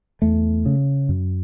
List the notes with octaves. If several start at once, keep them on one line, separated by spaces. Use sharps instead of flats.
E2 A3
C#3
F#2